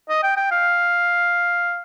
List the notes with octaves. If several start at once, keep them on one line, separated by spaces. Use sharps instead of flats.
D#5
G5
G5
F5